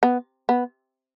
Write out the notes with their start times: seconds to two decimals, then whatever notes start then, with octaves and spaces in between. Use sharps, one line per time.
0.03 B3
0.49 B3